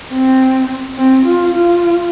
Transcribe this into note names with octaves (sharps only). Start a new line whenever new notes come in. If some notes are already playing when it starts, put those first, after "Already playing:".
C4
C4
F4
F4